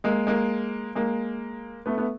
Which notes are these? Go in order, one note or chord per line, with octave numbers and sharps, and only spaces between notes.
G#3 A#3
G#3 A#3
G#3 A#3
A3 B3
A3 B3